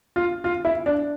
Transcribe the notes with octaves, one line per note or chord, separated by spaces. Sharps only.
F4
F4
E4
D4